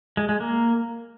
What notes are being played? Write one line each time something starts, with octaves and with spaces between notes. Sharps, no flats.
G#3
G#3
A#3